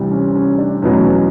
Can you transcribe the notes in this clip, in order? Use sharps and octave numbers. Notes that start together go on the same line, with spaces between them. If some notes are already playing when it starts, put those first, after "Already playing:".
Already playing: D2 C3 E3 G3
C#4
C#4
D4
F1 E2 B2 F#3 C#4